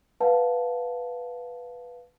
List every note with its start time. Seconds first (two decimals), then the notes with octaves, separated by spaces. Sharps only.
0.20 B4 F5 F#5 A5